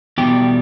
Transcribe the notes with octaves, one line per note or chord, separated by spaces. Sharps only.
E2 B2 G3 G4